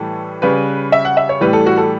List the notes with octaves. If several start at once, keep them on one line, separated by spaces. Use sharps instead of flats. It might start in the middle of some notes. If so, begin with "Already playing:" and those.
Already playing: A2 E3 G3 A4
C#3 G3 B4
E5
F#5
E5
C#5
A2 E3 G3 B4
A4
F#4
A4